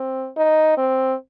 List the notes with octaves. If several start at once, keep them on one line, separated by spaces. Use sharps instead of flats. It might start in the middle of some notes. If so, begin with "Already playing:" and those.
Already playing: C4
D#4
C4